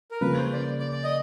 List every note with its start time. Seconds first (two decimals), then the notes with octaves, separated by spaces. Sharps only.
0.11 A#4
0.21 C#3 F3 A#3 B4
0.37 C5
0.53 D5
0.80 D5
0.92 D5
1.04 D#5